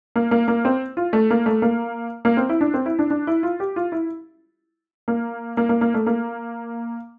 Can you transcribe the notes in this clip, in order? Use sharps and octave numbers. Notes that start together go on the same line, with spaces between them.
A#3
A#3
A#3
C4
F4
A3
A#3
A3
A#3
A#3
C4
E4
D4
C4
E4
D4
D4
E4
F4
G4
F4
E4
A#3
A#3
A#3
A#3
A3
A#3